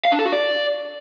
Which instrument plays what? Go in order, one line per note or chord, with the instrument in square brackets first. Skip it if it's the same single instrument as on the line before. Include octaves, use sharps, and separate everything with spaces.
[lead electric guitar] F5
D4
A4
F#4
D5